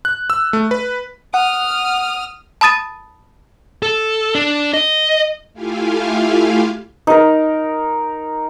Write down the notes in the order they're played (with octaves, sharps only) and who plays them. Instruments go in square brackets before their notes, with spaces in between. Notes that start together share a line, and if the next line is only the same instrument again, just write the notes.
[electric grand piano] F#6
E6
A3
B4
[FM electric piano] F#5 [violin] D#6 F6
[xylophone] A5 B5 D#6 A6 D#7
[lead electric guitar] A4
D4
D#5
[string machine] A3 E4 F4 G4 F5 G#5
[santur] D#4 A#4